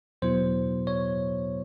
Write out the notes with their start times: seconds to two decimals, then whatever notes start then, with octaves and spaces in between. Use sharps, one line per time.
0.22 E2 B2 F#3 B3 E4 C5
0.87 C#5